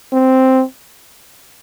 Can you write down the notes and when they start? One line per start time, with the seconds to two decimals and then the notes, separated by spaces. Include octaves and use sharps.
0.13 C4